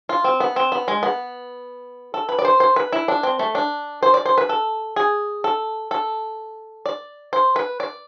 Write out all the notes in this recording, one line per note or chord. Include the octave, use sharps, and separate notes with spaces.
F4
C4
B3
C4
B3
G#3
B3
A4
B4
D5
C5
C5
B4
E4
D4
C4
A3
D4
C5
D5
C5
B4
A4
G#4
A4
A4
D5
C5
B4
D5